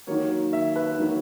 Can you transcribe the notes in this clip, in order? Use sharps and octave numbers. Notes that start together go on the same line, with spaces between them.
D#3 F#3 A#3 C#5
E5
B4
D#3 F#3 A#3